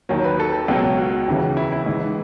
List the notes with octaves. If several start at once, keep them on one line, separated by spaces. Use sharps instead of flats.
D#2 D#3 F#3 C#5
B4
A4
C#2 B2 F#3
F#4
D#2 C#3 E3
E4
E4
G#2 E3